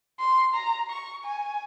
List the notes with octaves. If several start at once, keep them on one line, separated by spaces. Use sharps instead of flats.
C6
A#5
C#6
G#5